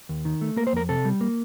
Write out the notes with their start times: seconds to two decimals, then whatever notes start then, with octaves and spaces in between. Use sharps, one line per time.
0.09 D#2
0.25 D#3
0.41 A3
0.56 A#3 A#4
0.67 C5
0.73 F2 A#4
0.89 C3 A4
1.05 G3
1.21 A#3